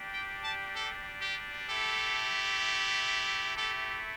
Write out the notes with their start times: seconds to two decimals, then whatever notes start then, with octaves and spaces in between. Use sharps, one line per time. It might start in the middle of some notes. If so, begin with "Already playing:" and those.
Already playing: G3 D4 G4
0.11 G5
0.43 A5
0.74 A4
1.21 G4
1.68 A3 E4 G4 A4
3.56 A3 E4 G4 A4